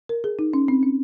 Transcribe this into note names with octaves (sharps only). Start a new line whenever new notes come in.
A#4
G#4
D#4
C#4
C4
C#4